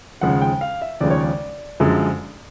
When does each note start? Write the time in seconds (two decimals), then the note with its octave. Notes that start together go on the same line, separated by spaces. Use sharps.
0.21 D#2 C#3 F3 G#3 F#5
0.42 G5
0.61 F5
0.82 E5
1.01 D#2 C#3 F3 G#3 D5
1.10 C#5
1.20 D5
1.80 F#2 D3 F3 G#3